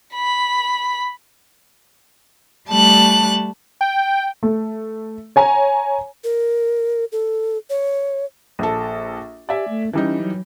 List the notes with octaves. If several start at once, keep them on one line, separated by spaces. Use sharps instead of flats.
B5
G3 A3 A5 F#6
G5
A3
C#5 G#5 A#5
A#4
A4
C#5
A#1 A4
G4 D5 E5 G#5
A3
E3 G3 C#4 D#4
F#3